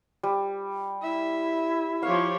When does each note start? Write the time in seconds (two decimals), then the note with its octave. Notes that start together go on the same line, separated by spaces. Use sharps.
0.23 G3
1.03 E4 E5
2.02 F3 G4 C#5 F5